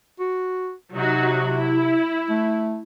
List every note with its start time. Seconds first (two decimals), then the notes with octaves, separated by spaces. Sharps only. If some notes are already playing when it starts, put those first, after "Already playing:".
0.20 F#4
0.93 C3 F#3 D#4 F#4
1.52 E4
2.30 A3